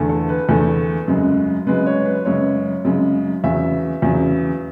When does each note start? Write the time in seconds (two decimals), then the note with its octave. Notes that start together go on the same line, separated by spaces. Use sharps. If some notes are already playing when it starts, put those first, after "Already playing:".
Already playing: E2 D3 A3
0.09 A4
0.29 B4
0.49 E2 D3 A3
1.08 F#2 C#3 G#3
1.67 F#2 C#3 G#3 B4
1.86 C#5
2.06 B4
2.25 F#2 C#3 G#3 C#5
2.85 F#2 C#3 G#3
3.44 E2 C#3 F#3 E5
4.02 E2 C#3 F#3